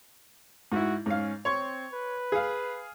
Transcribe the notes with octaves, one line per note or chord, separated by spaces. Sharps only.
G#2 E4 F#4
G#2 C#4 F5
C4 C#5 C6 C#6
B4
G#4 F5